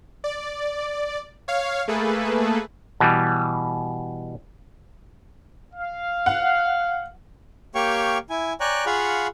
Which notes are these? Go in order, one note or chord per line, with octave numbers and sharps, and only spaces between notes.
D5
C#5 F5
A3 A#3 G#4 A4 B4
B2 E3 G3
F5
F#5
A#3 G4 C#5 F5 G5 C#6
E4 G#5
C#5 D5 G5 G#5 A#5 F#6
F4 G#4 F5 F#5 B5 C#6